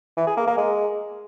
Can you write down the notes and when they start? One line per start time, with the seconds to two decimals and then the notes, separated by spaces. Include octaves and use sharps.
0.17 E3
0.27 G#4
0.37 A#3
0.47 A#3
0.57 G#3